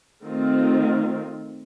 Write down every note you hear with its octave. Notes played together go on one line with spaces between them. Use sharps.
D#3 A3 C4 F4